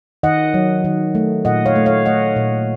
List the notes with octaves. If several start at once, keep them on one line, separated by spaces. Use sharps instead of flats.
D#3 D#5 F#5
F#3
D#3
A3
A#2 D#5 F#5
C#5 F5
A3
C#5 F5
A3 D#5 F#5
A#2